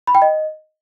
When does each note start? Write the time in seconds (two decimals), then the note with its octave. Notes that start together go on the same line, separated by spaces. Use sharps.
0.07 B5
0.15 G5
0.22 D#5